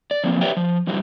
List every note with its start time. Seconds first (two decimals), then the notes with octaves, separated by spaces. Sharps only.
0.11 D5
0.24 E3 F3 A#3 C4
0.41 G4 B4 C#5 D5 E5 G5
0.57 F3
0.87 F#2 E3 F#3 G3